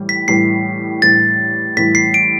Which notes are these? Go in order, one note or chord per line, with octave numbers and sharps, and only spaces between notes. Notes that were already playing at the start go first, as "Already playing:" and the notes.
Already playing: A2 E3 G3
B6
A2 E3 G3 C7
A2 E3 G3 A6
A2 E3 G3 B6
C7
D7